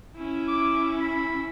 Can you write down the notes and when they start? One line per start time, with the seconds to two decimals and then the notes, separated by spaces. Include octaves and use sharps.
0.17 C#4 E4
0.48 D6
1.01 B5